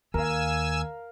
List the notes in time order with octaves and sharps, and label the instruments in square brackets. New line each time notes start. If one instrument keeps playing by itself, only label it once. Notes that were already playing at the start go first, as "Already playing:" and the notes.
[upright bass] D#2 [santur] A#4 F5 [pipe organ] G#5 E6